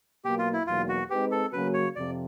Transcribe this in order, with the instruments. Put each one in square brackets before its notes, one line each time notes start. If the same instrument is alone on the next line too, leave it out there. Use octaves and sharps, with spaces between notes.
[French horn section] B2 F#3 A#3 [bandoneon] G4
[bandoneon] F4
E4
[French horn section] E2 B2 F#3 A#3 D#4 [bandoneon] F4
[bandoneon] F#4
[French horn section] G#3 C4 D#4 G#4 B4 [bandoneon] G4
[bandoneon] A4
[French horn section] C#3 F#3 A#3 C#4 F#4 [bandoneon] B4
[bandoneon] C#5
[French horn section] F2 C3 F3 [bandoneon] D5